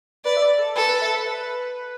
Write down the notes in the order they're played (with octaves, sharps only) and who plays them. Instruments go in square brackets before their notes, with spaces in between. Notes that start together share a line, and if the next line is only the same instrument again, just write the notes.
[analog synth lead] B4 [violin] D5
[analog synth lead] E5
D5
A4
[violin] A4 [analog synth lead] B4
[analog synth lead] B4
E5
B4
B4